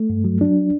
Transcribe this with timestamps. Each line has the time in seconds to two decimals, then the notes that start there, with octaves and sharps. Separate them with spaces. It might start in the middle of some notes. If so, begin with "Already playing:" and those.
Already playing: A3
0.10 G2
0.24 F#3
0.41 F#3 D4